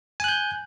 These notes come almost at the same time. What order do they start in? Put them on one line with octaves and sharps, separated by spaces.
G#5 F#6 G6